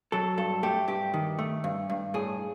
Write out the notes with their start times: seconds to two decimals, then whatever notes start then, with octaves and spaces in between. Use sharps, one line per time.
0.12 F#3 A4
0.38 G2 A4
0.63 A3 G4
0.88 G2 G4
1.14 D#3
1.39 A3
1.64 G2
1.90 G2
2.14 A2 G#4